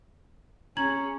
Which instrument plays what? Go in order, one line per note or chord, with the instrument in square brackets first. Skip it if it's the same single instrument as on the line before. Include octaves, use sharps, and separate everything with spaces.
[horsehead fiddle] C#4 G#4 [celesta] A#5 G#6 F#7